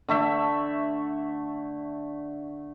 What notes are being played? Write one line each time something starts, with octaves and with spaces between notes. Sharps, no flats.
D3 A3 E5